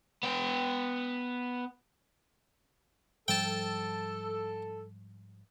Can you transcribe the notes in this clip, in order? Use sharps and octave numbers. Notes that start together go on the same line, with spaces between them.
B3 G5
G#2 F3 G3 A4 G5 A5